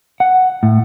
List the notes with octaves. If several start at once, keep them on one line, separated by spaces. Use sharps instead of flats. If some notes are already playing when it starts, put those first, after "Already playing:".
F#5
A2